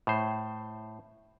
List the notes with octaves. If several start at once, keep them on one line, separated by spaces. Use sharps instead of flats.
A2 C5